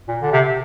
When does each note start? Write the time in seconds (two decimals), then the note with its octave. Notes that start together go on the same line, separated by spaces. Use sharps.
0.08 A#2
0.22 D3
0.32 C3